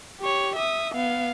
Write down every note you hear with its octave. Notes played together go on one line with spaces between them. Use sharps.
G4 C#5
E5 D#6
B3 F5